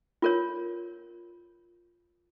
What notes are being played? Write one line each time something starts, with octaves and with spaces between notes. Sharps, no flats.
F4 A#4 C#5